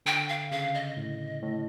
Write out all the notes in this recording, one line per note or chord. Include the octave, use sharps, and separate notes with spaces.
D3 G5
F5
C#3 F5
D#5
A2
A2